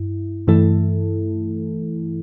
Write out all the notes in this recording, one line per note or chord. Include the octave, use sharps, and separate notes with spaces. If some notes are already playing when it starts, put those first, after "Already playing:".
Already playing: G2 E4
G2 E3 A3 E4 A4